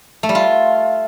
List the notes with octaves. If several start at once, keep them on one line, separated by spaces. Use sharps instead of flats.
A3
G3
F4